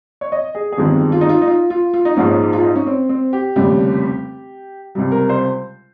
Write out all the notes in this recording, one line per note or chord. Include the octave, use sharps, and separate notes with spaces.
C#5
D#5
G#4
G#4
G1 F2 D#3 G#3 G4
F4
D#4
F4
D#4
F4
F4
F4
D#4
A#1 G#2 F3 G#3 C#4
D#4
F4
D#4
C#4
C4
C4
G4
F1 D#2 C#3 G3
C#2 C3 G3
A#4
C5